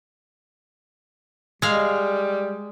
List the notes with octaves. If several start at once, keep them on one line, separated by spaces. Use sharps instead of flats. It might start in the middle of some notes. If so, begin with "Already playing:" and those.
G3 G#3 F5